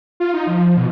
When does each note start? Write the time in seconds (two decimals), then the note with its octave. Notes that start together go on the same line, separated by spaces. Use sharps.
0.20 F4
0.34 D#4
0.47 F3
0.77 B2